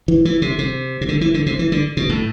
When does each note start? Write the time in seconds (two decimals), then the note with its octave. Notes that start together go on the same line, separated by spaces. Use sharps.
0.08 E3
0.25 E3
0.42 C3
0.59 C3
1.01 C3
1.09 D3
1.21 E3
1.34 D3
1.46 C3
1.59 E3
1.72 D3
1.97 B2
2.09 A2